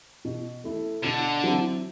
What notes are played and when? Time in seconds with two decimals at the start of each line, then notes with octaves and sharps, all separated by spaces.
0.25 B2
0.64 A3 E4 A4
1.04 B2 D3
1.44 F#3 C4 E4